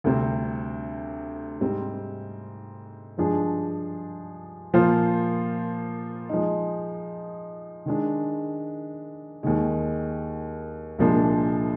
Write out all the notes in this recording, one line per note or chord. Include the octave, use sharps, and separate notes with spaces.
D2 C3 G3 C4
G#2 G3 C4
G2 F3 G#3 D4 G#4
A#2 F3 A#3 F4 C5
F3 G#3 D#4
D#3 G#3 D4
D#2 D#3 G#3
C2 A#2 F3 G#3 D4